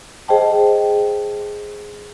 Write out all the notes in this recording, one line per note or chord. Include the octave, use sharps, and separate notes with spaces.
G#4 C5 D#5 G5 A5